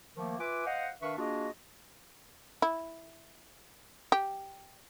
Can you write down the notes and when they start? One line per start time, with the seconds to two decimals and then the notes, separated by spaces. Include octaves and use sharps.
0.17 D#3 F3 A3 A#3
0.39 F4 B4 E5 G#5 D6
0.66 C5 D#5 F5 F#5
1.02 D#3 D4 B4 E5 F5 C#6
1.18 A#3 D4 F4 F#4 G#4 D#5
2.62 E4
4.12 G4